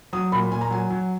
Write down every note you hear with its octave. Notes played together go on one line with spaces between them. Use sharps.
F#3 D#6
A#2 B5
A#2 G#5
A#5
F#3 G#5
F#3